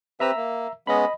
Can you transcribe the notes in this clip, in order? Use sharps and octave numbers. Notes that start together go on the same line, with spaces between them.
C4 G4 B4 E5 A#5 E6
A#3
G#3 B3 C#4 D#5 B5